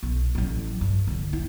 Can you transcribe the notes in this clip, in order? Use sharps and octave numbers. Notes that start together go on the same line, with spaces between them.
B1
A1 F#3
G2
D3 F#3
E1 E4